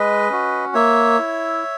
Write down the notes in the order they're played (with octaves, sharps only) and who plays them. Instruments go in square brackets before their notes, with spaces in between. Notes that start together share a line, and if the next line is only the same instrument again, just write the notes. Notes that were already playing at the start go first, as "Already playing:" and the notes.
Already playing: [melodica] G#3 B4 D#5
C#4 F#4
A#3 C#5 E5
E4